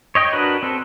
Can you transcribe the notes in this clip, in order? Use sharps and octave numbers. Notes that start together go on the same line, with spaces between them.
C#5 D#5 G5
D4 F#4 A#4 B4
C4 A4